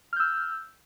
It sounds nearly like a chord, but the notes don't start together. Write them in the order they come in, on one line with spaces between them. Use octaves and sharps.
F6 G6 E6